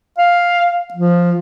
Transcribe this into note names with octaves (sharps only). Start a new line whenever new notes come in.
F5
F3